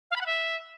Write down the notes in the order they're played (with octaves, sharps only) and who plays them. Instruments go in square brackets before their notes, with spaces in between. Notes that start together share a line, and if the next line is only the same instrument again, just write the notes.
[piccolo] F5
B5
F#5
E5